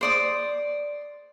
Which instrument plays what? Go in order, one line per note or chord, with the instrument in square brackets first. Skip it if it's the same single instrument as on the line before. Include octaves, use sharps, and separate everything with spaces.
[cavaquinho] C5 D5 D#6